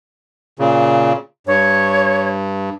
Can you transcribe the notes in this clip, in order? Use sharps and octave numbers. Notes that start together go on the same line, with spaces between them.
A#2 C#3
G2 C#5